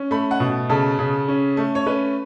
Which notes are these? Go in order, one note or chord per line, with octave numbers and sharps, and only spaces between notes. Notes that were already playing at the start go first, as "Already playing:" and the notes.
Already playing: C#4
A3 B5
F#5
B2
C#3 A4
C#3
C#4
A3
C#5
C#4 B4